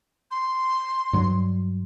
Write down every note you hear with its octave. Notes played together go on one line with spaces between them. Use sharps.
C6
G2 F#3